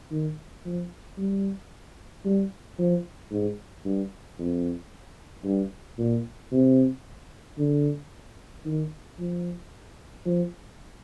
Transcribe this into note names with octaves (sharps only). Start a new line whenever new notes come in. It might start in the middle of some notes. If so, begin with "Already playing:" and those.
D#3
F3
G3
G3
F3
G#2
G2
F2
G2
A#2
C3
D3
D#3
F3
F3